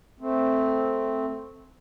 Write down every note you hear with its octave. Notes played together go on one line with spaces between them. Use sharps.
A3 C4